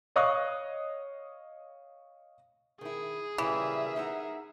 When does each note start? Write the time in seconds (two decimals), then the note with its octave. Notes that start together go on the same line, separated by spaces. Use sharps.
0.16 C#5 D#5 F5 C#6 D#6 F#6
2.81 D#3 E4 G#4
3.38 A#2 C#3 E3 G3 A#4 E5
3.96 D#4 F#5 A#5